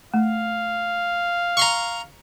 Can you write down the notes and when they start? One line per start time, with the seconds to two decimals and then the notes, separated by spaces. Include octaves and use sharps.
0.14 A3 F5
1.57 A#5 C6 C#6